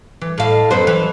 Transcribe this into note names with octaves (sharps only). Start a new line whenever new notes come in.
E3
A2 F5
F#2 B3 C5
E3